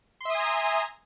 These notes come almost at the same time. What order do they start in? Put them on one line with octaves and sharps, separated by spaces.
C6 E5 D#6 G#5 A#5